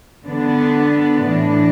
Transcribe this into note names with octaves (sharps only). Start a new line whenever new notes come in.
D3 B3 D4
A2 E3 D4